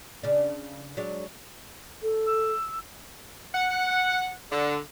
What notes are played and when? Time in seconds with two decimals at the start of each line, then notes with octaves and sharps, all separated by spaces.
0.23 C#3 D4
0.97 F#3 G#3 D4
2.02 A4
2.25 E6
3.55 F#5
4.52 D3